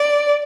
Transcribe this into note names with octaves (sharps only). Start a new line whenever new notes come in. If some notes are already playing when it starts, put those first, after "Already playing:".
Already playing: D5